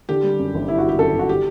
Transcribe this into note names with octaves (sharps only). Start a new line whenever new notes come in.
D3 G4
G3
F#2
G1
D3 E4
F#4
G3 G4
F#2 A4
G1
F#4
D3 G4